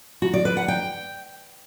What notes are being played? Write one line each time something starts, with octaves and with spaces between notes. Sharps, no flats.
F#4
D5
B4
F#5
G5